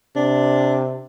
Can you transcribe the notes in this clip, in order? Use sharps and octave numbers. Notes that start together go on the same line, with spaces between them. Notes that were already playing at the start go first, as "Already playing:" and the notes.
C3 D4